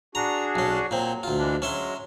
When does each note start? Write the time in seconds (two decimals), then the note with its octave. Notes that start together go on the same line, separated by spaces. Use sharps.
0.15 D4 F#4 G#4 A#5
0.55 B1 C#4
0.91 A#2 F#3 C4
1.23 D2 F4
1.37 E3 G#3 D4
1.62 F#3 G#3 C#4 E5 C6